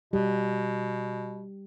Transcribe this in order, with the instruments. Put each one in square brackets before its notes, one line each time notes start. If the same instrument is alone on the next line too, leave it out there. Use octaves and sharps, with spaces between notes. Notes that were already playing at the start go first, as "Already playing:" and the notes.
[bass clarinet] B2 [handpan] G3 G4